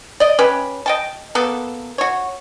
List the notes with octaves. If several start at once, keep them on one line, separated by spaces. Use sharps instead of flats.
D5 D#5
C#4 G4 B4
D#5 G5 A5
A#3 B3 A4
F#4 C#5